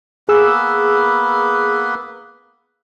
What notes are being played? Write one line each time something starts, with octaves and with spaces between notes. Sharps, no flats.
A#3 B3 G#4 B4 E6